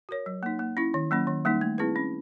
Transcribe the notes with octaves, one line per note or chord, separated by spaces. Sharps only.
F#4 A#4 C#5
F#3
A#3 D#4
A#3
C#4 E4
D#3
F#3 A#3 C#4
D#3
G3 A#3 D#4
A3
C4 E4 G#4 B4
C#4